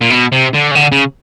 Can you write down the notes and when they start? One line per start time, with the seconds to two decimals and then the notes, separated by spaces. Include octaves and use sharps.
0.01 A#2
0.10 B2
0.32 C3
0.54 D3
0.71 C#3
0.75 D3
0.92 C#3